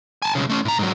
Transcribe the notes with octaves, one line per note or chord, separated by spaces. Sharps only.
G#5 A5
B1 C#3
A3 C#4
A2 A#5
G#2 F#3